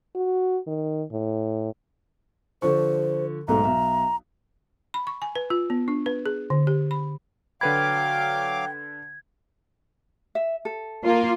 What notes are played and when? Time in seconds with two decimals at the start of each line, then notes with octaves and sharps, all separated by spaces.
0.16 F#4
0.67 D#3
1.12 A2
2.62 D3 F3 C5 C#6
3.48 B1 G#2 A3 A#5
3.64 B1 E5
4.94 B5
5.07 C#6
5.22 G#5
5.36 B4
5.50 F4
5.70 B3
5.88 D4
6.06 B4
6.26 G#4
6.50 D3
6.67 G4
6.91 B5
7.61 D3 F#3 B4 F5 G5 B5 D6 G#6
10.35 E5
10.65 A4
11.04 A#3 F4